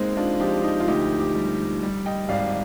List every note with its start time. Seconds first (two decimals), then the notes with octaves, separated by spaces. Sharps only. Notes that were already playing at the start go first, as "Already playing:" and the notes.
Already playing: G#3 A#3 C4 D#4
0.17 D4 F4
0.40 F3 D#4 G4
0.63 D#4 G4
0.80 F4
0.88 D2 D#4 G4
1.19 D#4 G4
1.35 G3
1.83 G3
2.06 D#5 G5
2.29 G#1 D5 F5